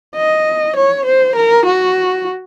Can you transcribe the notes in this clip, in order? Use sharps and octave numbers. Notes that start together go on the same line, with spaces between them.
D#5
C#5
C5
A#4
F#4